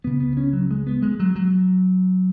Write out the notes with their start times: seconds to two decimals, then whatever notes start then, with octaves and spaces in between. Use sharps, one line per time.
0.04 C#2 C#3 B3
0.20 B3
0.37 C#4
0.53 F#3
0.71 G#3
0.87 B3
1.02 G#3
1.19 F#3
1.36 F#3